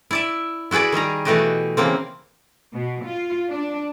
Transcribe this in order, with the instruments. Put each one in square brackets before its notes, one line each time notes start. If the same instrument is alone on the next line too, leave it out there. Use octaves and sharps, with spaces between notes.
[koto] E4 D5 E5
E4 F#4 G#4 B4 D5
D#3 G3 G#4 A#5
B2 E3 A3 F#4 G4 D#5
C#3 E3 A#3 C4
[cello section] B2
F4
D4